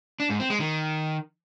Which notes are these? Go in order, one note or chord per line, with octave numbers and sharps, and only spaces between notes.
D4
G#2
C4
G#3
D#3